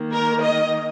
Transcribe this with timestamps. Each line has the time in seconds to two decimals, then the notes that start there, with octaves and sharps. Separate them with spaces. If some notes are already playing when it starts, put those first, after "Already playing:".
Already playing: D#3 A#3
0.12 A#4
0.44 D#5